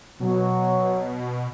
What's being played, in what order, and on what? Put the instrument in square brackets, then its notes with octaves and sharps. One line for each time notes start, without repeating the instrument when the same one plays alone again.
[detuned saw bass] B2 [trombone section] F#3